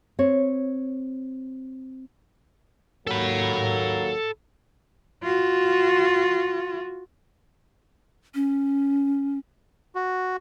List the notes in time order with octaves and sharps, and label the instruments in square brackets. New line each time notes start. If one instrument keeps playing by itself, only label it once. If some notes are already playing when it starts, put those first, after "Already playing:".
[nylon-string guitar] C4 C#5
[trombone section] D#2 F#3 A#3 [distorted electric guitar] A4 B5
[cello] F4 F#4
[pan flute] C#4
[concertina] F#4